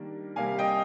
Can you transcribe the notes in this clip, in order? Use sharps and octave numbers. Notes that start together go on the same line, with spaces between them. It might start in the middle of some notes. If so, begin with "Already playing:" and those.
Already playing: D#3 G3 A#3 D4
C3 G3 A#3 F5 G#5
D#5 G5